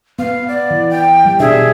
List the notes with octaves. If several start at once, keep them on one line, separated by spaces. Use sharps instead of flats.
B3 F5
D5
E3
G5
G3
B2 D4 G#4 E5